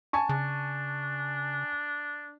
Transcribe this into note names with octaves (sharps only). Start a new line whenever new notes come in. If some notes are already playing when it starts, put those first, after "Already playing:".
G#5 A5 C#6
C#3 D4